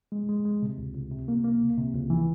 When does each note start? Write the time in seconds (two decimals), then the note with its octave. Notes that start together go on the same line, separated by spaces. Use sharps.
0.12 G#3
0.29 G#3
0.45 G#3
0.62 C3
0.78 C#2
0.95 C#2
1.12 C3
1.28 A#3
1.44 A#3
1.61 C#2
1.77 C3
1.94 C#2
2.10 E3